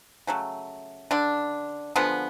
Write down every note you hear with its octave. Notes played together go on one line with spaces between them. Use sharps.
C#3 F#3 A3
D3 D4
D3 F3 G#3 B3